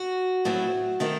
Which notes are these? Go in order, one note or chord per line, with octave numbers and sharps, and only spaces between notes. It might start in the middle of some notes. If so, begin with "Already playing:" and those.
Already playing: F#4
A2 F#3 A3 C4
D#3 A3 C4